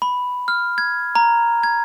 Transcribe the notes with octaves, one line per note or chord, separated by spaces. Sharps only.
B5
F6
G#6
A#5
G#6